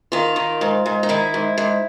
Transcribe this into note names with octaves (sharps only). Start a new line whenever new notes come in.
D#3 F4
D#3
G#2
G#2
D#4
D#3 E4
G#2
G#2